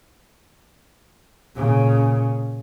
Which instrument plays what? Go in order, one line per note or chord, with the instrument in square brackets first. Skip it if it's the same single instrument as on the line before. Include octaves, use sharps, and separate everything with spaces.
[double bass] A#2 C#3